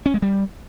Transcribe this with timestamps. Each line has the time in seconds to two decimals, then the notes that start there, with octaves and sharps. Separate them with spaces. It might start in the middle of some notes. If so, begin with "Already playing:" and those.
0.06 C#4
0.14 G#3
0.22 G3